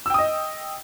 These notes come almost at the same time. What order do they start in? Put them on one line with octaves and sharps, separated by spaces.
E6 G5 D#6 D#5